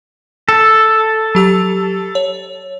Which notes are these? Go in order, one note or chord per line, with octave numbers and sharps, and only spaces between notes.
A4
F#3 G4 E6
C#5